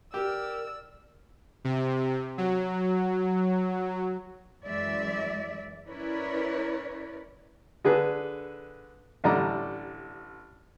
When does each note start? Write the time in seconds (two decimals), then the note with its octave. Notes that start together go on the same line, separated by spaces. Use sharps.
0.14 G4 A#4 D5 E6
1.65 C3
2.38 F#3
4.64 F#2 E3 G#3 D5 E5
5.89 C#4 E4 A#4 B4 C#5 D5
7.85 D3 G#4 A4 B4
9.24 A1 D3 G3 D5 D#5 A#5